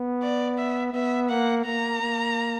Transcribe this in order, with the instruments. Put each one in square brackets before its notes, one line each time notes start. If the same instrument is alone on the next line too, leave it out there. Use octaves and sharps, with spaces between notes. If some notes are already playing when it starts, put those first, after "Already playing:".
Already playing: [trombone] B3
[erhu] D5
E5
[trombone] B3 [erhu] E5
[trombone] A#3 [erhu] F#5
[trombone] A#3 [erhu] A#5
[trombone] A#3